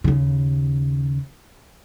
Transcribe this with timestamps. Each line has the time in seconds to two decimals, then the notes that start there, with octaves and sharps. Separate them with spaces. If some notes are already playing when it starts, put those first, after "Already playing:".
0.04 D#2 C#3